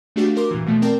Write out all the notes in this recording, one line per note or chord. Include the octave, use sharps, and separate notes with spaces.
A3 D4 F#4 G4 F5
F#4 G4 A#4 C6 D6
A#2 E3
B2 F3 A3
C4 A#4 D5 G5 A5